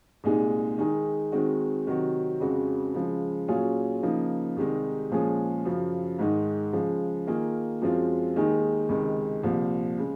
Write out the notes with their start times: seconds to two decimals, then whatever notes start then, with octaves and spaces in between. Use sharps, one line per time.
0.24 C2 A#2 G#3 D#4 G#4
0.78 D#3 G#3 D#4 G#4
1.32 D#3 G#3 C4 D#4 F#4
1.87 C3 D#3 F#3 C4 F#4
2.40 F2 C#3 G#3 C4 F#4
2.94 C#3 F3 G#3
3.48 A#2 F#3 C#4 F4 G#4
4.03 C#3 F3 A#3 D#4
4.57 C2 C3 D#3 G#3 D#4
5.10 A#2 F3 G#3 C#4 G#4
5.65 F#2 C#3 F3
6.19 G#2 D#3 G#3 D#4
6.73 C#3 F3 G#3
7.27 D#3 A#3 F4 G#4
7.81 F#2 F3 G#3 C4 F4
8.35 D#2 D#3 G#3 D#4 G#4
8.89 C#2 C3 D#3 G#3
9.44 C2 A#2 F3
9.98 C#3 G#3